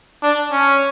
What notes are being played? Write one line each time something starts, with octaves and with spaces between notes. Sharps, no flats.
D4
C#4